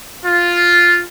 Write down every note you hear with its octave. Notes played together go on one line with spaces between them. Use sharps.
F4